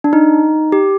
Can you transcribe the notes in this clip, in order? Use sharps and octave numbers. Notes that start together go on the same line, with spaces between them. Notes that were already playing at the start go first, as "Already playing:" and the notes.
D4
D#4
G4